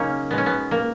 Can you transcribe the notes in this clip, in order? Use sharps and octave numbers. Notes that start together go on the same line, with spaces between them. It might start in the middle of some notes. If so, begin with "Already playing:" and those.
Already playing: C#3 F#3 A#3 C#4 D#4
B2 G#3 B3
C#4
B3
A#3